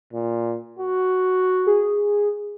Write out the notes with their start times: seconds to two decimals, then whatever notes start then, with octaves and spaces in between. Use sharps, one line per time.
0.13 A#2
0.79 F#4
1.67 G#4